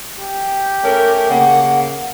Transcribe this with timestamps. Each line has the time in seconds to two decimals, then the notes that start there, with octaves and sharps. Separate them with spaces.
0.16 G4
0.83 A3 C#4 A#4
1.29 C#3 A#3 F#5